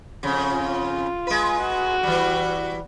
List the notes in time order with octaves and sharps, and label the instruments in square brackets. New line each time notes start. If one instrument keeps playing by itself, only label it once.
[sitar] F2 C#3
[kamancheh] F4
[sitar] G#3 B4
[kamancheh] F#4
[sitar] E3 G3